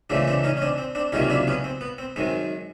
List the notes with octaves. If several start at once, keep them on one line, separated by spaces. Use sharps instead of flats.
C#2 C#3 E3 A3 C4 D4
C4 D4
C#4 D#4
C#4
C4 D4
C4
C4 D4
C#2 C3 D#3 F#3 A#3 C#4 D#4
D4 E4
B3 C#4
C4
B3
C4
F#2 D#3 G#3 C4